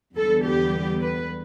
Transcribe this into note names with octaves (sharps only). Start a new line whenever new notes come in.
E2 D3 G3 B3 A4
G4
B4